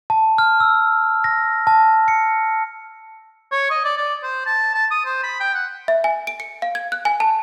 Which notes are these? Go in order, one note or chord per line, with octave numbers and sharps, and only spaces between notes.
A5
F6
E6
A#6
A5
C#7
C#5
D#5
D5
D5
C5
A5
A5
D#6
C5
B5
G5
F#5
E5
G#5
D7
C#7
F5
G#6
F#6
G#5
A5